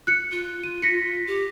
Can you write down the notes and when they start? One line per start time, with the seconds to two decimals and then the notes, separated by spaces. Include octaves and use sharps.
0.07 F#6 C#7
0.31 F4
0.64 D#7
0.82 A#6 B6 C#7
1.27 G4